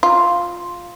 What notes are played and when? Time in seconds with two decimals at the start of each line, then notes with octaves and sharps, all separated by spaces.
0.03 F4